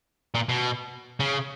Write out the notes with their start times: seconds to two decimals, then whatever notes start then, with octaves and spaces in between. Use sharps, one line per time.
0.35 A#2
0.49 B2
1.20 C#3